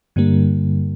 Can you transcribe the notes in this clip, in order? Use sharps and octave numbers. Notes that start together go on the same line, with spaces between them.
G2 D3 G3 A#3